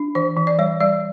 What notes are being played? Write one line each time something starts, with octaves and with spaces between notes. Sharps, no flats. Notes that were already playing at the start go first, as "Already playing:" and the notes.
Already playing: D4
E3 C5
E3
D5
G3 C#5
G3 D5